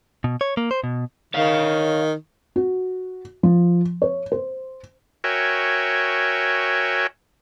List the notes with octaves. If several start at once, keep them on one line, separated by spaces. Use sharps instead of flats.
B2
C#5
A#3
C5
B2
D#3 C#5 F5
F#4
F3
C#5
C5
F#4 A#4 C#5 E5 G5 G#5